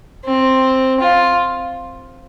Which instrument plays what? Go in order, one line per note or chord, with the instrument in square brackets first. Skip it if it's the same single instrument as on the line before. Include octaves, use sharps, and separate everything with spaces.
[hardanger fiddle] C4
F4